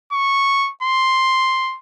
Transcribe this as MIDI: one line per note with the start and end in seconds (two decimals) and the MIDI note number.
0.13 0.71 85
0.83 1.78 84